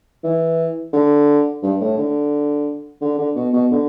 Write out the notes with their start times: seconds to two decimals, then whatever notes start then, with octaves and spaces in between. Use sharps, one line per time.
0.24 E3
0.93 D3
1.63 G2
1.81 A2
1.97 D3
3.01 D3
3.18 D3
3.36 B2
3.53 B2
3.71 D3